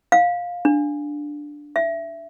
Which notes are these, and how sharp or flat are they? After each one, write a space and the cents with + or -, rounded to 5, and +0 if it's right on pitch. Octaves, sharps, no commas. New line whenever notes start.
F5 +15
D4 +0
E5 +15